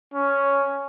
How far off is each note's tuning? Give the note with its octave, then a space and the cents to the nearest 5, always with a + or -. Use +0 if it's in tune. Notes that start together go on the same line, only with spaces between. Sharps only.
C#4 +5